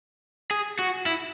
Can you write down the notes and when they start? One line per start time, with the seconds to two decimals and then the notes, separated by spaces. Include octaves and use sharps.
0.51 G#4
0.79 F#4
1.06 E4